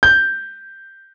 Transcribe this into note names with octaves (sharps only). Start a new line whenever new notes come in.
G6